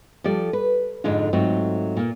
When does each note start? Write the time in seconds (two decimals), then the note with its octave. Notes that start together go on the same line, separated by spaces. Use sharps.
0.24 F3 G3 A4 D5
0.53 B4
1.04 F2 G#2 D3 G#3 D4 F4
1.33 G#2 F#3 A3 C4 F4
1.96 A#2 A#3